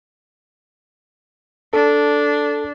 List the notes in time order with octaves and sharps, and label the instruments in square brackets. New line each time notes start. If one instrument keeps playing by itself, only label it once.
[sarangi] D4 [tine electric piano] A4